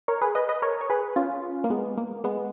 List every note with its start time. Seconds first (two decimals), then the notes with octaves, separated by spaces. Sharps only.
0.08 A#4 C#5
0.21 G#4 B4
0.35 B4 D#5
0.49 B4 D#5
0.62 A#4 C#5
0.81 C#5
0.90 G#4 B4
1.16 C#4 F4
1.64 A#3
1.70 G#3 B3
1.98 A#3
2.24 G#3 B3